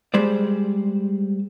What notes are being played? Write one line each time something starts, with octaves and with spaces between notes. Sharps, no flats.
G3 G#3 C5 D5